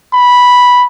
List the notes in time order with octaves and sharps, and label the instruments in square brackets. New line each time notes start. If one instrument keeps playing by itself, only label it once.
[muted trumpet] B5